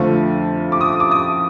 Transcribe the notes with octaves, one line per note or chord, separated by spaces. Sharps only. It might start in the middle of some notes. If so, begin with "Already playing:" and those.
Already playing: F2 D3 F3 A3
D6
D#6
D6
D#6